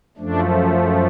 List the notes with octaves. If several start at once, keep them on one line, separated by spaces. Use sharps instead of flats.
F#2 F3 A3 D4